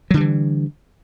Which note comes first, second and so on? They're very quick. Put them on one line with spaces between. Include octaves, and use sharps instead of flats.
F#3 D3 G3 E3